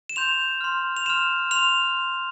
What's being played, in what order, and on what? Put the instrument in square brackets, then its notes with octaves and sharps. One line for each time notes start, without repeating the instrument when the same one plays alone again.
[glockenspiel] E7
C6 G6 F7
C6 F6
F7
C6 F6 E7
C6 F6 F7